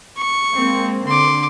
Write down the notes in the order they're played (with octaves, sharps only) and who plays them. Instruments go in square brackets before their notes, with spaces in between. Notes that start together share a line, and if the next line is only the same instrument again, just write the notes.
[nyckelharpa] C#6
[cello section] G#3 A#3 C4
[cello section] D3 [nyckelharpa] C6 D6